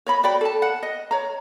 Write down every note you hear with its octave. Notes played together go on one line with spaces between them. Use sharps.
C#5 D#5 B5
F#4 D5 G5 B5
A4 A5
F#5
D#5
C#5 A#5